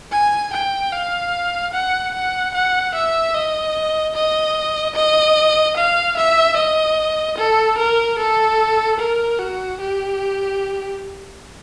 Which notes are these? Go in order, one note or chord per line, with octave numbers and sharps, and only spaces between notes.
G#5
G5
F5
F#5
F#5
F#5
E5
D#5
D#5
D#5
F5
E5
D#5
A4
A#4
A4
A#4
F#4
G4